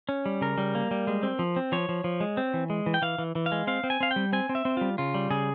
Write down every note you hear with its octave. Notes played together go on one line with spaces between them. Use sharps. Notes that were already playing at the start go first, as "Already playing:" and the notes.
C#4
G3
C#3 A#4
G3
A#3
G3
G#3
C4
F3
C4
F3 C#5
F3
F3
G#3
C4
E3
G#3
E3
G5
E3 F5
E3
E3
F5
G#3
C4 F5
C4
G#5
C4 F5
G5
G3
C4 G#5
C4
E5
C4
G3 F4
C#3 F4
G3
C#3 G#4